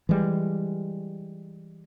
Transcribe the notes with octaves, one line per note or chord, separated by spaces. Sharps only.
E3 G3 G#3